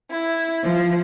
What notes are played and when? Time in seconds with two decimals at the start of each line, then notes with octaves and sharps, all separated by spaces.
0.10 E4
0.64 F3